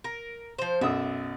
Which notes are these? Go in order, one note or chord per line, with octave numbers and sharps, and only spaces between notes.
A#4
F3 C5
B1 F#2 E5 D#6